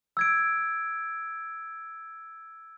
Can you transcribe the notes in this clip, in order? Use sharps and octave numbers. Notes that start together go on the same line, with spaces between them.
E6 G#6 D7